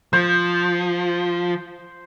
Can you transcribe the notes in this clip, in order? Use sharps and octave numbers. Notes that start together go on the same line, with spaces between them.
F3 C5